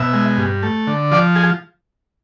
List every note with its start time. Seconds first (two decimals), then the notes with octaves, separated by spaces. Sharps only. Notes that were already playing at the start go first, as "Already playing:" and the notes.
Already playing: B2 E5
0.13 G#3
0.37 G2
0.63 A3
0.87 D3
1.12 F3 D5
1.36 G#4